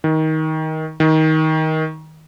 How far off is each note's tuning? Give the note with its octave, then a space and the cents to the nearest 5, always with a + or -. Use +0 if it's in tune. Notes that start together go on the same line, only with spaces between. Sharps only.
D#3 +20
D#3 +20